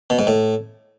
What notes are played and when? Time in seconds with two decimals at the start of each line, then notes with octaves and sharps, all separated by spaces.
0.10 B2
0.19 G#2
0.27 A2